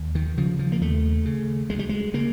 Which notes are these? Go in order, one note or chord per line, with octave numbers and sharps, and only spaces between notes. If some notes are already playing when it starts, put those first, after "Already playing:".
Already playing: D#2
D#3
C#3 F3
F3
A#3
D#2 A3
C#3
D2 G#3
G3
G#3
C#3 A#3